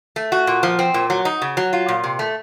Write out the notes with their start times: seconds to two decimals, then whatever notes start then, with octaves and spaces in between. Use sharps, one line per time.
0.16 A3
0.32 F#4
0.47 A#2
0.63 F3
0.79 C4
0.94 A#2
1.10 F#3
1.25 D#4
1.42 C#3
1.57 F#3
1.73 F4
1.89 A#2
2.04 C3
2.19 A3